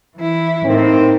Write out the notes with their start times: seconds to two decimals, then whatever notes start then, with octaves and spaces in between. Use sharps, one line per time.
0.16 E3 E4
0.65 A2 A#3 C4 D#4